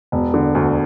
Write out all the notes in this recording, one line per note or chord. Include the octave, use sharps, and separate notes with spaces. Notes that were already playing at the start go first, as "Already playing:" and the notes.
E1
D3
D2